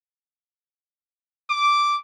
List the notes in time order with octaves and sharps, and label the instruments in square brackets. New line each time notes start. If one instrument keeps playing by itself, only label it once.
[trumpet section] D6